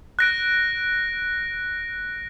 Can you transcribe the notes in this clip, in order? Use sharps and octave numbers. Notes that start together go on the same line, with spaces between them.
F#6 A#6 D7